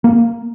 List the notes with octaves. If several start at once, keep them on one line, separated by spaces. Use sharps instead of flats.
A#3